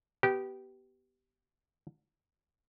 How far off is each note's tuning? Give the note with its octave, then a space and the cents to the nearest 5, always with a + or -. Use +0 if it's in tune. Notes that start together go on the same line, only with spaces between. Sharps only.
B3 +0 G4 -20